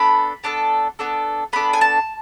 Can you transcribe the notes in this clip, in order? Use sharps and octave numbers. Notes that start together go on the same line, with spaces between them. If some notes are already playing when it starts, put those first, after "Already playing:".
Already playing: B3 D4 A4 B5
B3 D4 A4
B3 D4 A4
B3 D4 A4 B5
G#5
A5